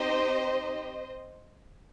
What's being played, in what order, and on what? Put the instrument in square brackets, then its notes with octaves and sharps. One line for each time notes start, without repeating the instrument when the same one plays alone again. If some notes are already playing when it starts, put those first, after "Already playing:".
Already playing: [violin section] C4 D#4 G4 C5 D#5